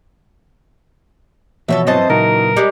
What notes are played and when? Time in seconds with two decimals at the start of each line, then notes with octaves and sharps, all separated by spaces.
1.68 B2 E3 F3 B3 A4 C5 C#5 E5
1.87 G2 E3 F#3 C4 C5 D#5 A5
2.10 A#2 C#3 F#3 D#4 F#4 A#4
2.57 G3 G#3